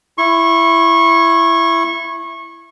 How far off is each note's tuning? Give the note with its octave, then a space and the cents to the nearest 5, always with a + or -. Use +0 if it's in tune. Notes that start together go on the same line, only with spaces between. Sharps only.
E4 +15 C#6 -25